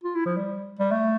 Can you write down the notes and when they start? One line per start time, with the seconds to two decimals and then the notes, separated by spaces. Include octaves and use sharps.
0.04 F4
0.16 E4
0.26 F3
0.37 G3
0.79 G3
0.91 A3